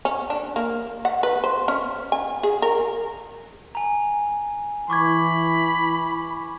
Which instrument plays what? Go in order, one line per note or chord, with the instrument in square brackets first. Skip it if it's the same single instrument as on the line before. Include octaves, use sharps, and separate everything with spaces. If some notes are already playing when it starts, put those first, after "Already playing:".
[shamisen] C#4
D4
A#3
F#5
B4
C5
C#4
G#5
G#4
A#4
[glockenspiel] G#5 A#5
[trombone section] E3 [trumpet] B5 [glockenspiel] C#6 D6 G#6